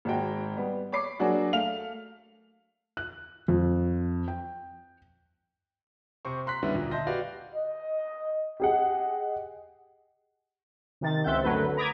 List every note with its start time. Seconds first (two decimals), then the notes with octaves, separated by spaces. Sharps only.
0.05 G#1 G#3 F#4 G5
0.57 G3 B3
0.92 C#5 B5 D6 C7
1.19 F#3 A#3 D4 F#4 G#4 D5
1.53 A3 F5 F7
2.97 F#6
3.48 F2
4.28 G5
6.25 C3 C5 C#6
6.46 A#5 C6 F#6 B6
6.63 D3 D#3 G3 B3 C#4 E4
6.75 D2 A#2
6.91 D#5 E5 A5 C6 G6 A#6
7.07 F#4 G4 B4 D5 F5
7.55 D#5
8.60 G4 G#4 D#5 F#5
11.01 C3 D#3 A6
11.24 C#2 C4 E5 F#5 G6
11.43 F#2 D3 F#3 A3 B4
11.77 A#5 B5 D6 D#6 G#6 A6